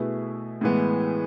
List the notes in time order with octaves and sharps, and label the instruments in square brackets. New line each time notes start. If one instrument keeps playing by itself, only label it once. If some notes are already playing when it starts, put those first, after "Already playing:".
Already playing: [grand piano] B2 A3 E4 G#4 B4
A2 E3 G#3 B3